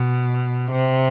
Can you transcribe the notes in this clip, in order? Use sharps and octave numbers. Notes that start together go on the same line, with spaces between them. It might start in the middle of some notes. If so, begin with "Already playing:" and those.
Already playing: B2
C3